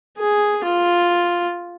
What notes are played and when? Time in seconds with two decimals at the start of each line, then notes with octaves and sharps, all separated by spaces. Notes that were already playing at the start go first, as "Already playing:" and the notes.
0.19 G#4
0.64 F4